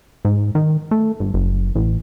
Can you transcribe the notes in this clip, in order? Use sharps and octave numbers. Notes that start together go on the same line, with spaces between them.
G#2
D#3
A3
G1
F#1
A1